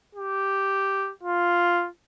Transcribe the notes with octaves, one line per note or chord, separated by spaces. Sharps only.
G4
F4